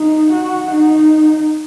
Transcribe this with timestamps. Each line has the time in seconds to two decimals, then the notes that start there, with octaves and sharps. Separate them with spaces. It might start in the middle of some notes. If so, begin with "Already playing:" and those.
Already playing: D#4
0.32 F#4
0.71 D#4